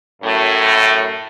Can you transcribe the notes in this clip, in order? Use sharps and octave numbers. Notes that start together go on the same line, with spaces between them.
F#2 A2